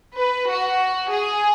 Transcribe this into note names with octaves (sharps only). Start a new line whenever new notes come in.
B4
F#4
G#4